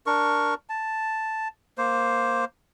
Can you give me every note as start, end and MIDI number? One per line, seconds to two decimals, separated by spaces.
0.06 0.54 62
0.06 0.54 70
0.06 0.54 85
0.69 1.48 81
1.78 2.45 58
1.78 2.45 72